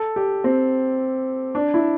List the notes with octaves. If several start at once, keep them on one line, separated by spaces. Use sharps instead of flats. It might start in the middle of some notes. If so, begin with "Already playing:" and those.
Already playing: A4
G4
C4
D4
E4